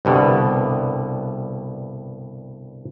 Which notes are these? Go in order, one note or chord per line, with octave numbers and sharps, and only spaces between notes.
C2 G2 B2 D3